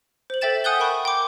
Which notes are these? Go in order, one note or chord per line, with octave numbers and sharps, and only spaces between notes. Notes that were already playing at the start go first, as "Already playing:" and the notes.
C5 F#7
A4 C5 E5 G5 A6 E7
F#5 G#5 D#6 F#6 G6 G7
A#4 G5 B5 C#6
G5 C6 D6 G6